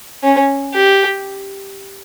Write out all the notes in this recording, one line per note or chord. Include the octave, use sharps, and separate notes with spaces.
C#4
G4